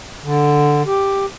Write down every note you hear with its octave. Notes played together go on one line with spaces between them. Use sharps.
D3
G4